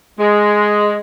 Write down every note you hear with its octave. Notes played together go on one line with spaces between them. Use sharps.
G#3